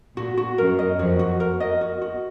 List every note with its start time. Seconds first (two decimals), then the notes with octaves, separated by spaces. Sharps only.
0.16 A#2 F#4
0.37 F#4
0.58 F#2 A#4
0.79 D#5
0.98 F2 F#4
1.19 F#4
1.40 A#4
1.60 D#5
1.81 F#4
2.01 F#4